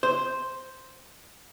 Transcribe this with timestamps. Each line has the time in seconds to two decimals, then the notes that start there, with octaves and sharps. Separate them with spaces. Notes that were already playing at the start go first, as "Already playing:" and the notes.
0.03 C5